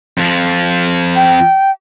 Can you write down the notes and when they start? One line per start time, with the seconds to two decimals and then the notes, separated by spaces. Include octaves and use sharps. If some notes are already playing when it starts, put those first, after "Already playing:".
0.18 F2 F3
1.16 G5